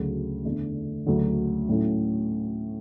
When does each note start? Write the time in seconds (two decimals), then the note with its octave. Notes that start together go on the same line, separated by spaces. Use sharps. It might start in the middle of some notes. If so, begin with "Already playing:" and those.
Already playing: D2 C#3 F#3
0.44 E2 D3 A3
1.06 D2 C#3 F#3 A3
1.69 A2 F#3 A3 C#4 E4